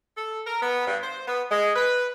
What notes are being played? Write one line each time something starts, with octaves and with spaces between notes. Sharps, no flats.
A4
A#4
B3
G2
C5
B3
G#3
B4